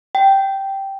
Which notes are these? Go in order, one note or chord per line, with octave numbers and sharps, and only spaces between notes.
G5